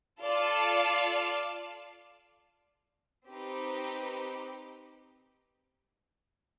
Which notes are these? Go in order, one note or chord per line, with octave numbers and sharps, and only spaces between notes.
F4 A4 D5 F5 A5
C4 D#4 G4 B4